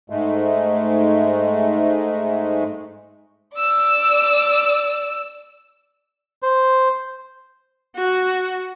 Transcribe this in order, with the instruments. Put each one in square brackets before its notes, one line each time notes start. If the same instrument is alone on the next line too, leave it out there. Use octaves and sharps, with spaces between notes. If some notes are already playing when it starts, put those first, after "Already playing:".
[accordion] G#2 G#3 A3
[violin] D5 E6
[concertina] C5
[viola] F#4